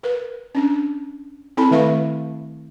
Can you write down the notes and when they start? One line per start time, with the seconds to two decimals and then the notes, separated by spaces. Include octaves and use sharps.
0.03 A#4 B4
0.55 C#4 D4
1.57 C4 E4 A4 A5 B5
1.71 D#3 A3 B4 E5 F5 C#6